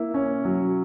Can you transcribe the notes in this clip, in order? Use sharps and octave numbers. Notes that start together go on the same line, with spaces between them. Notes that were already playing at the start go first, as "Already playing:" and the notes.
Already playing: A#3 E4
C#4
F#3